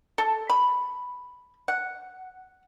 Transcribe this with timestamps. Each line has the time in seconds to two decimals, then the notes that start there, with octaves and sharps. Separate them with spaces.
0.18 A4
0.50 B5
1.68 F#5